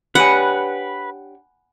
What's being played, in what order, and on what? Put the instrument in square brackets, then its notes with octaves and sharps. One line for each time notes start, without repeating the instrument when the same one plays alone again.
[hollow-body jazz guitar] D4 G4 C#5 [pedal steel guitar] B4 [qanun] F#5 [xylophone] G#5 B5